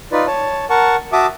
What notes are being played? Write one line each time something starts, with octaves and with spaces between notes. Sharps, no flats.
D#4 F4 B4 D5
C#5 A5
A#4 F#5 A5 C#6
F#4 E5 A5 D6 D#6